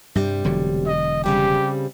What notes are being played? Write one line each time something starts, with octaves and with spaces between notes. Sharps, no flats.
G2 C3 G3
E1 D3 F#3
D#5
C#3 G3 C4 G4